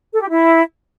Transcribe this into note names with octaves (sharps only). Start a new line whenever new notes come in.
A4
G4
E4